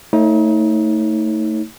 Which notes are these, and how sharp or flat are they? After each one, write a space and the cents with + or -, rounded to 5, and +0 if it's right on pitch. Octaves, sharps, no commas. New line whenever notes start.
A3 +25 D#4 +35 C#5 -15